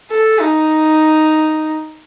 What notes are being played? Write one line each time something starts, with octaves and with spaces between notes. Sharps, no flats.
A4
D#4